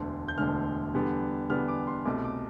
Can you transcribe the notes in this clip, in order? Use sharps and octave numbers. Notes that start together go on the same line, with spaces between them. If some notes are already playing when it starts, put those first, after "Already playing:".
Already playing: E1 D2 D3 A3
G6
E1 D2 D3 A3 F6
E2 D3 G3 B3
E2 D3 G3 B3 F6
D6
C6
C2 B2 A3 D6
D6